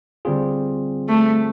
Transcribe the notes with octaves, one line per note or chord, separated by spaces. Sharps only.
D3 G3 C4 F4 G#4
A3